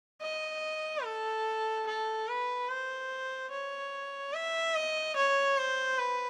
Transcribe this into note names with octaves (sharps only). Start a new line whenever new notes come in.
D#5
A4
A4
B4
C5
C#5
E5
D#5
C#5
C5
B4